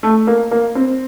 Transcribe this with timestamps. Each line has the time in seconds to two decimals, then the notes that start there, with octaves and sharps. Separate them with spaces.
0.03 A3
0.27 A#3
0.51 A#3
0.75 C4